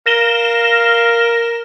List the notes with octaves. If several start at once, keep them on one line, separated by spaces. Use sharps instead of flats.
A#4 F5 A#6 E7 G7